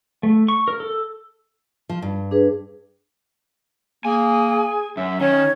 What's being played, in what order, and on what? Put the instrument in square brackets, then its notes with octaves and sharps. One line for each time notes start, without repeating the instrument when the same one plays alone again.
[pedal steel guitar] A3
C#6
A#4
A4
[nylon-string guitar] F3
G2
[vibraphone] D4 G#4 B4
[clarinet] A#3 [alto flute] G#4 [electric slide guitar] G#5
[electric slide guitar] F#2 [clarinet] E5
[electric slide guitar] D#3 [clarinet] C#4 [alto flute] C#5